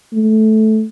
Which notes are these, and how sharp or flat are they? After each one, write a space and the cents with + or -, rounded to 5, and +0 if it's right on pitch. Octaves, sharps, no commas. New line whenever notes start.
A3 -10